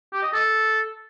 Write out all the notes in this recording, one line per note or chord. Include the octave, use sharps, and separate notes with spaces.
G4
D#5
A4